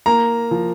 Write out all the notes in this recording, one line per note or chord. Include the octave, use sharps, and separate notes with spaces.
A#3 A#5
F3